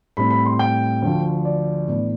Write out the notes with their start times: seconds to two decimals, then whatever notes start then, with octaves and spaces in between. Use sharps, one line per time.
0.17 A2 G3 C4 B5
0.31 B5
0.45 C6
0.59 G5
1.02 D2 D3 F3
1.45 D5
1.88 A2 E3 B3 D4